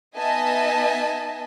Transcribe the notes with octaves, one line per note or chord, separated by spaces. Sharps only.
B3 D#4 D#5 E5 G#5 A5